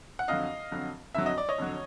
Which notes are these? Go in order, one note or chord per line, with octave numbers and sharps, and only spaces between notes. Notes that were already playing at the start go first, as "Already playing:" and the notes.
F#5
F2 D3 F#3 D#5 F5
F2 D3 F#3
F2 D3 F#3 E5
D#5
D5
C#5 D#5
F2 D3 F#3